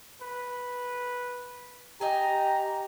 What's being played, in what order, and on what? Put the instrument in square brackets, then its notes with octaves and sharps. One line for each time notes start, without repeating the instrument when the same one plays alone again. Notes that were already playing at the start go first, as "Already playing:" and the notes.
[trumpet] B4
[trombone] G4 [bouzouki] D#5 G#5 [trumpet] A#5